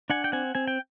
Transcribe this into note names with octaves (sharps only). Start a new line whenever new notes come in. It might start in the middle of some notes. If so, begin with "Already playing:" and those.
D4 F#5 G#5
G5
C4 F#5 G#5
C4 G#5
G5